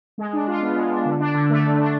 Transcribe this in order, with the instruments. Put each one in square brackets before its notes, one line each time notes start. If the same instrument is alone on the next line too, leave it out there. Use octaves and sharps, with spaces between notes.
[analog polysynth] G#3
D4
F4
B3
G#3
D4
D3
D4
D3
A3
D3
D4